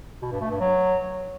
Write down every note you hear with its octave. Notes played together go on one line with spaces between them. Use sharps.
B2
G2
A3
G2
F#3